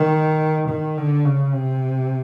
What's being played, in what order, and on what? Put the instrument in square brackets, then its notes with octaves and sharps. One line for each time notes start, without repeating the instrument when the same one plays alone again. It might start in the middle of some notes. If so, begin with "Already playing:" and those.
Already playing: [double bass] D#3
D#3
D3
C#3
C3